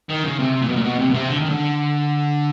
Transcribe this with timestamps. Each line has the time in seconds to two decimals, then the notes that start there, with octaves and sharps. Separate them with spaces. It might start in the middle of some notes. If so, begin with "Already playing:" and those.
0.09 D#3
0.24 C#3
0.39 C3
0.62 A#2
0.69 B2
0.76 A#2
0.84 B2
0.99 C3
1.10 B2
1.14 C3
1.29 D3
1.39 D#3
1.50 D3